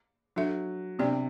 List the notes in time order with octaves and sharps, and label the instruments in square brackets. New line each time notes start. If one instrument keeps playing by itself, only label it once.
[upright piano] F#3 [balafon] D4 A4 E5
[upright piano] C3 [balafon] B3 D4 G4 D5